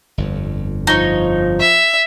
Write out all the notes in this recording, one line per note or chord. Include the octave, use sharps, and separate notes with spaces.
G1 F2
F3 D#4 C#5
E5